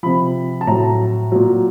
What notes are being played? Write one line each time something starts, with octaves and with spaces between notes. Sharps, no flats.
C3 F3 B5
A5
A2 F#3 A#5
A#2 F#3